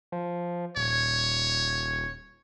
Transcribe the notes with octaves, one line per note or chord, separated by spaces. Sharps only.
F3
D#1 C#5